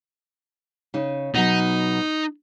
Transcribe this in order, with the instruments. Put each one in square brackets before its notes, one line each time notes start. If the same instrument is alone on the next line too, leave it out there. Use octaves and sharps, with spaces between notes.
[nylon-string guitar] C#3 D#4
[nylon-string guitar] B2 F#3 [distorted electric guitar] D#4